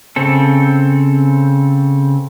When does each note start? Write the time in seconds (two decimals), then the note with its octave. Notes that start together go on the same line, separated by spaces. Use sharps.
0.16 C#3 C4 A4